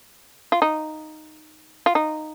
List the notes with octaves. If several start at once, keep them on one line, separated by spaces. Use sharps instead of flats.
F4
D#4
F4
D#4